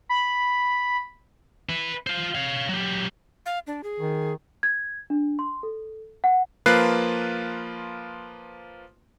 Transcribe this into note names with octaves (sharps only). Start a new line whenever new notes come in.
B5
E4 B4
F4 C5
C#5 F5
F#3 G4
F5
D4
G#4
D#3
G#6
D4
C6
A4
F#5
F3 A#3 F4 B4 F#6 C7